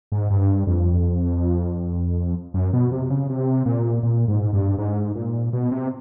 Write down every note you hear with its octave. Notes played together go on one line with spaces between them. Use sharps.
G#2
G2
F2
F#2
B2
C3
C#3
C3
A#2
A#2
G#2
G2
G#2
A#2
B2
C3